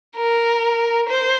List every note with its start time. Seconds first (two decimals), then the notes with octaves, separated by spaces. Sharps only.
0.16 A#4
1.09 C5